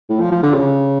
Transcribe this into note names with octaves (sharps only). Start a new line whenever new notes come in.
A2
F3
F3
D3
C#3